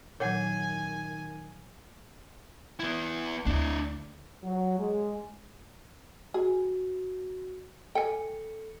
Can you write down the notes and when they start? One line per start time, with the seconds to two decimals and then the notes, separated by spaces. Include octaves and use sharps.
0.20 A#2 D#3 F#3 C#5 F#5 G#5
2.79 B3 E4
3.46 D2 D4 E4
4.44 F#3
4.79 G#3
6.34 F#4 G#4
7.95 A4 G5 G#5 C#7